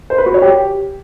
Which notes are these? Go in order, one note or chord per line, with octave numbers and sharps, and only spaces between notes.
C5
B4
F#4
C#5
G4